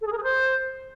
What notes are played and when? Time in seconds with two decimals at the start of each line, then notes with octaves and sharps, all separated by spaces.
0.01 A4
0.06 G#4
0.12 A#4
0.17 G#4
0.23 C5